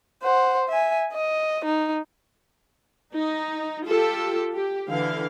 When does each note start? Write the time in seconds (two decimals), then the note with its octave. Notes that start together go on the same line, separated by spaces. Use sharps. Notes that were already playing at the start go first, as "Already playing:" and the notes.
0.23 C5 F#5
0.69 E5 G#5
1.13 D#5
1.65 D#4
3.13 D#4
3.86 F4 G4 A4
4.54 G4
4.88 D3 E3 F5